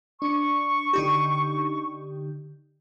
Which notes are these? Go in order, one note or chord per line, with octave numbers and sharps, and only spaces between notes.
D4 C#6
D3 D#4 G4